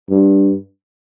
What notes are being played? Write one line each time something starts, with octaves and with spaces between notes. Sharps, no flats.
G2